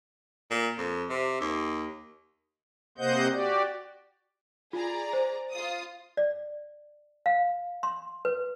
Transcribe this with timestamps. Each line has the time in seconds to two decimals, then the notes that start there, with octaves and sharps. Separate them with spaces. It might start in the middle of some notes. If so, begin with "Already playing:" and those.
0.51 A#2
0.78 F2
1.10 C3
1.40 D#2
2.98 C3 A#3 C5 D#5 F#5 G6
3.33 F#4 G4 D5
4.73 F4 G#4 D5 A#5
5.13 C5
5.51 F4 D#6
6.17 D5
7.26 F5
7.83 C6
8.25 B4